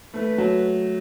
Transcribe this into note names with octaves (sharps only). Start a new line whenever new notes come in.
A3 B4
F#3